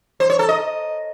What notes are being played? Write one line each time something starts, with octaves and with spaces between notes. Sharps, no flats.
C5
C#5
A4
D#5